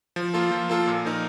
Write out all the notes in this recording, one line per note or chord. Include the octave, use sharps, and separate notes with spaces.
F3
A#3 F4 A4
F3
A#3 F4 A4
A#2
F3 A#3 D#4 A#4